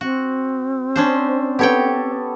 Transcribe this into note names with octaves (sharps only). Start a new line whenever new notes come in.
C4 F#4
C#4 D4 C5
B3 G4 A4 C#5 G5